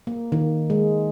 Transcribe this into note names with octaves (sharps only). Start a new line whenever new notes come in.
A#3
D#3
G#3